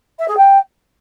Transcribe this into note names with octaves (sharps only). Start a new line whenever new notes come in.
E5
G#4
G5